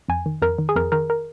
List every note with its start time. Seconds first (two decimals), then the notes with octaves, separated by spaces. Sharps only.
0.08 F2 G#5
0.26 D#3
0.42 F2 A#4
0.58 D#3
0.69 G#4
0.76 F2 A#4
0.92 D#3 A#4
1.10 A#4